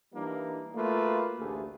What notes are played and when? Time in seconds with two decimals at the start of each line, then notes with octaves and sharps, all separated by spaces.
0.14 E3 G3 A#3 D4 D#4
0.75 A3 A#3 F4 F#4 B4
1.40 A1 D2 A3 G4 G#4